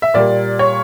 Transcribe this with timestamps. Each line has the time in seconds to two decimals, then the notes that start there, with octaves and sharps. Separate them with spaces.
0.02 E5
0.14 A#2 G3 A#3 D5
0.59 C#5